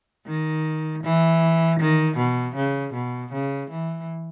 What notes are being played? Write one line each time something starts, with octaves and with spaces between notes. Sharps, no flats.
D#3
E3
D#3
B2
C#3
B2
C#3
E3